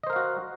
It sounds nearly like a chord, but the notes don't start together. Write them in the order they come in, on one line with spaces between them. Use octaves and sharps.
D#5 C5 A#4 F5 F#4